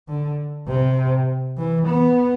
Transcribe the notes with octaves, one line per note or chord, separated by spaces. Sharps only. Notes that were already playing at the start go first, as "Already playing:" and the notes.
D3
C3
E3
B3